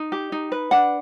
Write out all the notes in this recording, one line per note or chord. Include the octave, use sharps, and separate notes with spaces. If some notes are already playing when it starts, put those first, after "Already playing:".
Already playing: D#4
G4
D#4
B4
D4 F#5